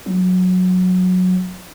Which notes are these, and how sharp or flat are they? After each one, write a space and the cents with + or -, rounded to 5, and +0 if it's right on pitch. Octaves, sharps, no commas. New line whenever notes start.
F#3 -15